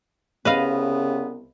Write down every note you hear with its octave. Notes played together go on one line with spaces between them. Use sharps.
C2 C#3 B3 B4 D#5 F5